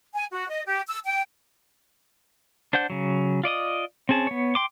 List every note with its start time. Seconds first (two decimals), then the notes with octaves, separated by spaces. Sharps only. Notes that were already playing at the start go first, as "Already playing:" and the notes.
0.13 G#5
0.31 F#4
0.50 D#5
0.66 G4
0.87 E6
1.05 G5
2.73 D4 C5 F#5 G6
2.90 C#3 F#3
3.44 F4 D5 D#5 D#6
4.09 C4 C#4 G#4 A5
4.27 B3 C#5
4.55 G5 C6 D6